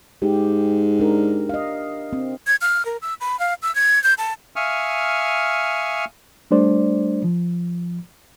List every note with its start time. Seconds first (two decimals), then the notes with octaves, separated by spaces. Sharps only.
0.22 G#2 G4
1.00 D4 A#4
1.49 D#5 F5
2.13 C4
2.47 G#6
2.61 F6
2.85 A#4
3.02 E6
3.20 B5
3.39 F5
3.62 E6
3.75 G#6
4.04 G6
4.18 A5
4.56 E5 F5 G#5 C#6 D#6 F6
6.51 G3 A3 D4 C5 D5
7.24 F3